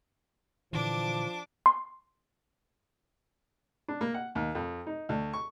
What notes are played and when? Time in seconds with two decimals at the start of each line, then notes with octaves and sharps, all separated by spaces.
0.73 A#2 D3 E3 F3 D4 D6
1.66 C6
3.88 D4
4.01 A#3
4.14 F#5
4.35 D#2
4.55 F2
4.87 D#4
5.09 D2
5.33 C#6